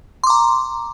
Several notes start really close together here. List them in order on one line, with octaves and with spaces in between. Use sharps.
C6 D6 A#5